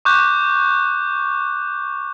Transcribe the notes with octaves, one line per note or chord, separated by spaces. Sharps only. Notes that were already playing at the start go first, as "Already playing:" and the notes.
C#6 D6 F#6 G6